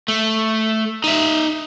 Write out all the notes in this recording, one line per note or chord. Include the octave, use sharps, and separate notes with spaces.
A3
D#4 E5